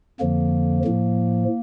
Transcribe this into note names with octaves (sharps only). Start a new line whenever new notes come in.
F2 D3 F3 A#3
A2 F3